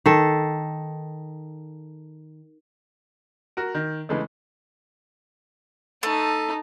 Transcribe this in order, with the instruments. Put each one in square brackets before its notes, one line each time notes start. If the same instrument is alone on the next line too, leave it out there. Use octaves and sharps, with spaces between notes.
[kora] D#3 A4
[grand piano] F#4 A#4
D#3
C#3 E3 G#3 A3
[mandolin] A3 [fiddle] D#4 A5